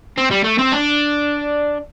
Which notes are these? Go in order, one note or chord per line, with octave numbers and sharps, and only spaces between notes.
C4
G3
A3
C4
D4